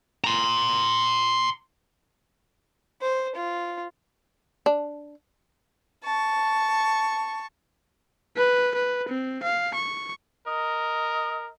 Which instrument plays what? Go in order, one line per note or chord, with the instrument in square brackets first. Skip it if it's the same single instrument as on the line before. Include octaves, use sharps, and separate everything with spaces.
[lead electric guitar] A#5 C6
[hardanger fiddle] C5
F4
[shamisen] D4
[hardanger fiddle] A5 C#6
[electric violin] B4
B4
C4
F5
C#6
[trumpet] A#4 [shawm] D#5